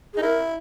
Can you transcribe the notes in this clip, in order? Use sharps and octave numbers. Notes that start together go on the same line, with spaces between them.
G#4
D#4
E4 A#4